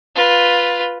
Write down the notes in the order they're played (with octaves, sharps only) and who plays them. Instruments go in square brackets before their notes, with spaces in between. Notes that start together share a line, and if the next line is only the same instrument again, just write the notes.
[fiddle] F4 B4